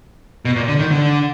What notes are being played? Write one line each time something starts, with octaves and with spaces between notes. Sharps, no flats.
B2
A#2
D3
D#3
D3